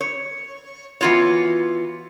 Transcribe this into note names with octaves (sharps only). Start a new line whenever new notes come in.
C#5
E3 B3 F4 F#4 C#5